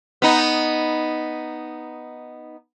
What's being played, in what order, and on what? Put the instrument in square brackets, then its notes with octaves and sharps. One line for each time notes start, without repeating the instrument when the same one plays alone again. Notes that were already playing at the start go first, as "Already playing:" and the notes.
[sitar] B3 D#4